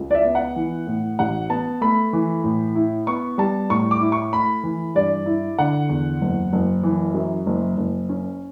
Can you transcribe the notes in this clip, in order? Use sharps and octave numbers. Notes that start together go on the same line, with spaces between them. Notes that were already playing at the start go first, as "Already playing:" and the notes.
Already playing: C#2
D5
E5
B3
F#5
E3
A2
A1 F#5
B3 A5
A3 B5
E3
A2
E4
B3 C#6
G3 A5
A2 C#6
D6
E4
C#6
A3 B5
E3
G2 D5
E4
D3 F#5
E2
F#1
F#1
E3
F#2
F#1
F#1
C#4